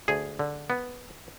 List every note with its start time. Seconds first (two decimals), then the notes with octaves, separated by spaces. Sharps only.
0.08 D2 G#4
0.39 D3
0.70 B3